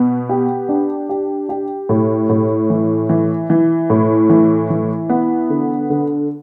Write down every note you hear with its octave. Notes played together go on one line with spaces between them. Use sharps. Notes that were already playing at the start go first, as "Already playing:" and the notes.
Already playing: B2 B3
G4
D4
G4
G4
A2
A2
E3
E3
E3
A2
E3
E3
B3
D3
D3